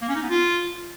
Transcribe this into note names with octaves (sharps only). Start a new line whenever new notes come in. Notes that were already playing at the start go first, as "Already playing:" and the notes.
A#3
C#4
D#4
B3
F4